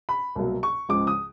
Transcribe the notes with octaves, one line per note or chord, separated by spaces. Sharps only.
B5
C2 B2 F#3 A#3
C#6
C#2 C#3 F3 G#3 D6
D#6